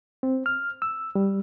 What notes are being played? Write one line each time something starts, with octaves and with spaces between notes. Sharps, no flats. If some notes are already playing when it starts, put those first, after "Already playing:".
C4
F6
E6
G3